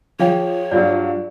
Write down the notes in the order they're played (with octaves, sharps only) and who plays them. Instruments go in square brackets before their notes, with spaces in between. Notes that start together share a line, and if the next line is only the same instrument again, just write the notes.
[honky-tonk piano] F3 [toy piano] G#4 F5 G5 [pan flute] C#5
[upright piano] G2 F#3 [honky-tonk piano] F4 F5 [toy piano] D5